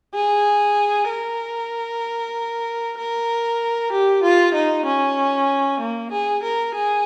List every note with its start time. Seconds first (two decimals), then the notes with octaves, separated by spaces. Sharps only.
0.15 G#4
1.09 A#4
2.98 A#4
3.92 G4
4.23 F4
4.54 D#4
4.85 C#4
5.80 A#3
6.12 G#4
6.43 A#4
6.75 G#4